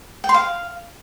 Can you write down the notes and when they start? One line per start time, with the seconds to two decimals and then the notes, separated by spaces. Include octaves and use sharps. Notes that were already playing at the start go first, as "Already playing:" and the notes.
0.24 G5
0.29 C6
0.34 F5